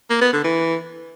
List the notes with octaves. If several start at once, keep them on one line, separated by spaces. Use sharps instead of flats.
A#3
B3
D3
E3